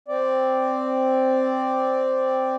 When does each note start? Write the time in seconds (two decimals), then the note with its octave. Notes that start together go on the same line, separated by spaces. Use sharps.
0.08 C4 D5